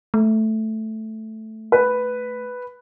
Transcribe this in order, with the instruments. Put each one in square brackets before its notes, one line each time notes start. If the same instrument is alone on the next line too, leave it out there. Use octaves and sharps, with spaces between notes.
[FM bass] A3
[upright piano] B4